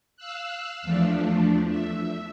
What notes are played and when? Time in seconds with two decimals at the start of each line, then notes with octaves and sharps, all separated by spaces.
0.17 F5 E6 F#6
0.82 E2 F3 A3 D4
1.67 E5